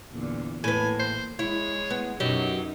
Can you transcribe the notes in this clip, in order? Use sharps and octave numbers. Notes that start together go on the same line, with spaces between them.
E2 A#2 D3
A2 A#3 B4 G#5
C5
G#3 E4 C#5
B3
F#2 B2 F#3 D#4 G4